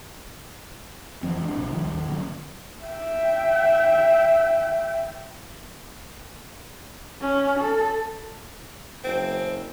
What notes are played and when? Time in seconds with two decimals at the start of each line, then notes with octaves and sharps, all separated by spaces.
1.23 F1 E3 F3 C4
1.41 G#2 D4
1.56 A#1 C3
1.73 C#2 D#3 F3 G3
1.87 G#1 D#2
2.09 D3 F#3 A#3 C#4
2.85 E5 G5
7.21 C#4
7.60 A4
9.04 F#1 C4